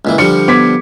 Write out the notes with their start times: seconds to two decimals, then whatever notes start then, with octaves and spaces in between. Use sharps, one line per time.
0.05 C#2 A#2 E3
0.18 D3 F3 G3 C#7
0.48 B3 D6 G#6 B6